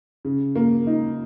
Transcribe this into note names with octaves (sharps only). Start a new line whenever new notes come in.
C#3
A#3
D#4